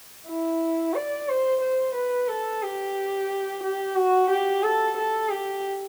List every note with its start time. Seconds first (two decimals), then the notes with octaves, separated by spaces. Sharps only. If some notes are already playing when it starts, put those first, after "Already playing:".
0.28 E4
0.94 D5
1.29 C5
1.61 C5
1.95 B4
2.28 A4
2.63 G4
3.63 G4
3.96 F#4
4.30 G4
4.63 A4
4.97 A4
5.30 G4